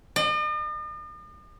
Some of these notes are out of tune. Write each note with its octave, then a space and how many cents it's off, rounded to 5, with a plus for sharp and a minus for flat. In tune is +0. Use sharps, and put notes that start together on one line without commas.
D#5 -45